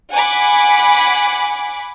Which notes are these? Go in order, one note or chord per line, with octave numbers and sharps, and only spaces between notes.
F#5 G#5 B5 D6